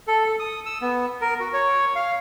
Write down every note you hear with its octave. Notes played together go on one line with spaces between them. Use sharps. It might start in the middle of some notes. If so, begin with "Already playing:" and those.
A4
A4
D#6
E6
B3
A#4
F#4
C#5
F5